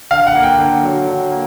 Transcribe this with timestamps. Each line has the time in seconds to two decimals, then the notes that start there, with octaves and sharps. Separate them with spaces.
0.11 D3 F5
0.27 F#5
0.35 A#3
0.43 G5
0.59 D3
0.83 F#3
1.07 D3
1.32 A#3